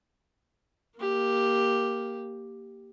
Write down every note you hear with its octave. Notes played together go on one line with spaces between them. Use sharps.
A#3 G4